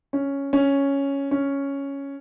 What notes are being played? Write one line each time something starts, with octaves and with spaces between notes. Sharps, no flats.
C#4
C#4
C#4